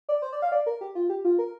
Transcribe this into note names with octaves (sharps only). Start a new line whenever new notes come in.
D5
C5
D5
F5
D5
A#4
G4
F4
G4
F4
A#4